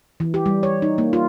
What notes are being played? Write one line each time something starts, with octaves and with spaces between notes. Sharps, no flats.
E3
G4
G3
C#5
D#4
A#3
F4